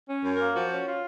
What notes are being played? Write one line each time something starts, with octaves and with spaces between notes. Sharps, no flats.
C#4
F#2
A#4
A#3
F3 F#4
C#4
F4